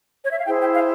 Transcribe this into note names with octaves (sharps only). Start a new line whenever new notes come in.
C#5
E5
F5
E4 G#4 C5 G5
G5
F5